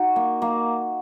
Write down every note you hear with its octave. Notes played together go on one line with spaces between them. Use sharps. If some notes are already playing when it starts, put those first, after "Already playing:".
Already playing: D#4 F#4
A#3
A#3